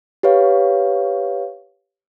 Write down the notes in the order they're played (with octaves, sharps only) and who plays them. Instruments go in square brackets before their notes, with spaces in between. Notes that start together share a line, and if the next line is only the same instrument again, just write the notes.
[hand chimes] G4 B4 C#5 F5